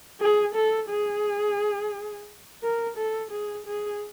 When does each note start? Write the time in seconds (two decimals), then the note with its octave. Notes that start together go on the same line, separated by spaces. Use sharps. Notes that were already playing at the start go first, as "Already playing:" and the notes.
0.21 G#4
0.55 A4
0.90 G#4
2.63 A#4
2.97 A4
3.32 G#4
3.67 G#4